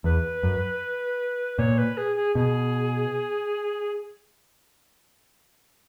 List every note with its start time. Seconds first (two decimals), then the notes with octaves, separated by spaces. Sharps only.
0.04 E2 B4
0.43 F#2
1.59 A#2 C#5
1.78 B4
1.97 G#4
2.16 G#4
2.35 B2 G#4